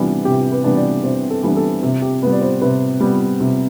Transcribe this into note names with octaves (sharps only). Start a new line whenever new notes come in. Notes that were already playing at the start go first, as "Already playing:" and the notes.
Already playing: C3 E3 G3 B3 D4
C3 G4
B4
E3 G3 B3 D4
D5
C3 C5
A4
E3 G3 B3 D4
A4
C3
G4
G3 B3 B4
D5
C5
C3 B4
G3 B3
C3